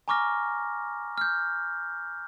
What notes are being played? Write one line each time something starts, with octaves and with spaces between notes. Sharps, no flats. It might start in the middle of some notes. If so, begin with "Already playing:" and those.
G#5 A#5 C#6 D6 F6 A#6
F6 G6